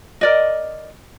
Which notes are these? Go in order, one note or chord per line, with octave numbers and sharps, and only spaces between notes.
A#4 D5 D#5